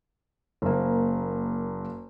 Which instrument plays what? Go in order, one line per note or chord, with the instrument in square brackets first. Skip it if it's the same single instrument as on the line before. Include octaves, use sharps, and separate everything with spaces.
[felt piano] F#1 A#3